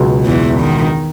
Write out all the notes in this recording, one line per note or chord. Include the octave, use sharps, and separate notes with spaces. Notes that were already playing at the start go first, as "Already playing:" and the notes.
Already playing: C#2 B2 F#3
E2 E3
D#3